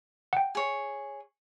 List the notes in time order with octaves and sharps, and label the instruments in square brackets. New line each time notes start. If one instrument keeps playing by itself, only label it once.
[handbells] F#5 G5
[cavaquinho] G#4 C#5